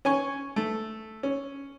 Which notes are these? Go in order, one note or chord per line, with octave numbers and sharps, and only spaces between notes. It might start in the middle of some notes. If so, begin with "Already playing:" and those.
C#4 G#5 C#6
A3
C#4